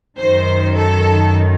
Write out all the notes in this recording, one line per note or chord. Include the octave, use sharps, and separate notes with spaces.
F#2 D#3 C5
A4